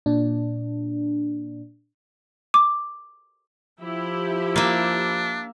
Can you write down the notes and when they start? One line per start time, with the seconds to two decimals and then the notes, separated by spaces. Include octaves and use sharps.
0.06 A#2 D4
2.54 D6
3.81 F3 E4 G4
4.56 A#3 D4 E5